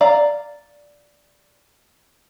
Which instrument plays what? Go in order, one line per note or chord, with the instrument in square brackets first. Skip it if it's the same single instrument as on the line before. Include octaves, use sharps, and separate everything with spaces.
[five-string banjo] D5 F5 A#5